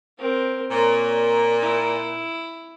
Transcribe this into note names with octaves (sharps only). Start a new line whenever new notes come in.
C4 A#4
A#2 C#5
E4